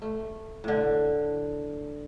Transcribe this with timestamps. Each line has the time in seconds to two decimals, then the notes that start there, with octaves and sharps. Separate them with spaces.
0.02 A3
0.64 A2 D3